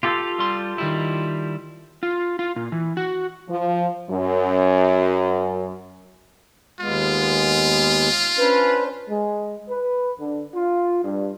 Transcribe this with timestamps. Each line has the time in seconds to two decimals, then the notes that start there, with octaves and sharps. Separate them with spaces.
0.03 F4 G4 A4
0.39 G3 C6
0.78 D#3 G3 E4
2.03 F4
2.39 F4
2.56 A#2
2.72 E3
2.97 F#4
3.48 F3
4.09 F#2
6.80 D#2 G#3 B3 F4
8.38 C#4 D4 B4 C5
9.10 G#3
9.69 B4
10.19 D3
10.55 F4
11.03 G2